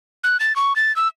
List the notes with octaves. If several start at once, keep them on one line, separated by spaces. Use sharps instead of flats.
F#6
A6
C#6
A6
E6